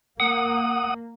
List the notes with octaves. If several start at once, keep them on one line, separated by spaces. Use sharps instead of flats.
A#3 F#5 D#6